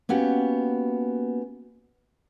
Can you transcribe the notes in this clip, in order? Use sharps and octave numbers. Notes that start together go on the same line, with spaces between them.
A#3 B3 C#4 F#4 G4